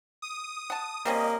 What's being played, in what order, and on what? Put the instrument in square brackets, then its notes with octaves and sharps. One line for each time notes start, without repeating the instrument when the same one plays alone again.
[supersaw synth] D#6
[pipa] F#5 A5
[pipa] G3 C4 C#4 [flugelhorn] A#3 [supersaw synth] D#5